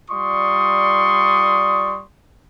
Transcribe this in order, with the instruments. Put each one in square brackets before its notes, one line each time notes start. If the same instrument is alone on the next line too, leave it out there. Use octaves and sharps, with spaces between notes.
[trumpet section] G3 F4 D5 C6 C#6 D#6